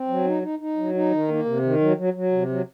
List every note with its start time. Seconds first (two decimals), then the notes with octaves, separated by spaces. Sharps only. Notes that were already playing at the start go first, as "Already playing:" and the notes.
Already playing: C4
0.08 F#3
0.25 D#4
0.43 D#4
0.59 D#4
0.77 F#3
0.94 D#4
1.11 D#3
1.28 A#3
1.45 C3
1.63 D#3
1.80 F#3
1.97 F#3
2.14 F#3
2.32 C3
2.49 F#3